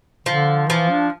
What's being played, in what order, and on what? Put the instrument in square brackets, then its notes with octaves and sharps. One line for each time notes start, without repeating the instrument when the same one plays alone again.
[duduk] D3 [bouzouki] F3
[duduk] E3 [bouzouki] F3
[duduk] D4